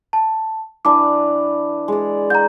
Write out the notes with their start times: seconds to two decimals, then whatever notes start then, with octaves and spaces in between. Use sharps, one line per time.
0.13 A5
0.85 E3 D4 B4 D6
1.88 G#3 D5
2.30 F#5 A#5 G6